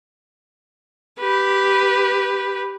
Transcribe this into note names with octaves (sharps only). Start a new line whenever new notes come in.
G4 B4